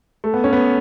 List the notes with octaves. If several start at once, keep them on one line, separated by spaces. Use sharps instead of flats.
A3
B3
C#4
B3